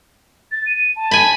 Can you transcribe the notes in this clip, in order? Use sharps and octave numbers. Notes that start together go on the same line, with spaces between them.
A6
D#7
A5
G#5 B5